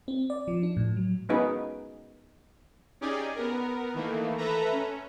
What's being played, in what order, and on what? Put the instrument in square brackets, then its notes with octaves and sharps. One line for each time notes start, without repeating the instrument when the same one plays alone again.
[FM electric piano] C4
D5
F3
D4
A2
F#3
[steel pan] B3 C#4 D#4 F#4 G#4 B4
[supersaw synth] C#4 D#4 G4 G#4 D5 G#5
B3 A#4
D#3 E3 A3 A#3
A4 B4 E5 A#5
C#4